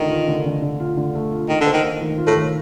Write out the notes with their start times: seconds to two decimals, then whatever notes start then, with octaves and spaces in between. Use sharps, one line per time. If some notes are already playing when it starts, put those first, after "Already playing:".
Already playing: D3 D#3 A3 F4
0.10 F4
0.28 D3
0.46 D3
0.62 D3
0.80 F4
0.97 D3
1.15 A3
1.32 F4
1.49 D#3 A#3
1.61 D3
1.66 C5
1.73 D#3
1.83 A#3
2.01 D#3
2.18 F4
2.27 A2
2.35 D#3